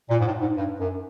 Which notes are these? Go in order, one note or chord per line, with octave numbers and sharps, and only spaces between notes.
A#2
G#2
A2
G#2
G2
F#2